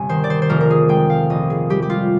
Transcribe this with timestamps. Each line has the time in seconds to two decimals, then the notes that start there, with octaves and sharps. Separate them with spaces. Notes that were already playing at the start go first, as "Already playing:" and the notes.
Already playing: G1 C3 G#5
0.09 D#3 C5
0.24 D5
0.30 C5
0.42 C5
0.49 F1 A#4
0.61 A#4
0.70 G#4
0.89 G#3 G5
1.10 F5
1.30 A#1 D#5
1.50 G#4
1.70 G3 G4
1.82 G4
1.90 F4